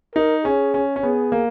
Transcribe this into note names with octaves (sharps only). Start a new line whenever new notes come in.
D#4 A#4
C#4 G#4
C#4
C#4
B3 G#4
A#3